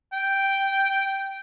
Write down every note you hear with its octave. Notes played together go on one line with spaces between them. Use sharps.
G5